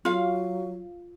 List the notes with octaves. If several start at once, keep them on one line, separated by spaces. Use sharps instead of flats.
F#3 F4 F5